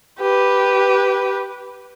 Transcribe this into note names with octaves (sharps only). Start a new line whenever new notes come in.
G4 B4